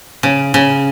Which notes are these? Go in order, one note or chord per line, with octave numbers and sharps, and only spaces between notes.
C#3
C#3